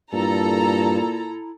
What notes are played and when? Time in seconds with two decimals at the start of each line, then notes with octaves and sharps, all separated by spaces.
0.13 G2 A#2 E4 A4 A#5